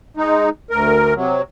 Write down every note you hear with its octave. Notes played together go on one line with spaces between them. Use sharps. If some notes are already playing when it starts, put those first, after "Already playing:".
G#3 D#4
D2 A#4
C3 F#3